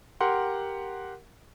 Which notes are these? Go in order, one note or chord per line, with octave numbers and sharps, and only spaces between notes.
G4 A#4 F#5 C6